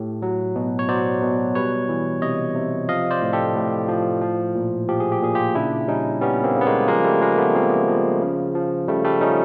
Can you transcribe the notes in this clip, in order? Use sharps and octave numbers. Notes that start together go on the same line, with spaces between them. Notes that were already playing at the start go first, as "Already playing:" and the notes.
Already playing: A2 G4 A4
F#3
B2
C#5
F#3 C5 D5
B2
G3 B4 C#5
E3
C3 C#5 D#5
C3
F3 D#5 F5
C5 D5
A2
G4 A4
A2
F3
F3
A#2
F3 G4
G#4
G4
A#2 G#4
F4 G4
C#3 D4 E4
G3 C#4 D#4
G3 B3 C#4
A#3 C4
C#3
B3
G#3 A#3
F3 G#3 A#3
G3 A3
F3 G#3 A#3
A3 B3
F3 A#3 C4
F3
C#3
F3
C#3 G3 A3
G3 A3
F3 C#4 D#4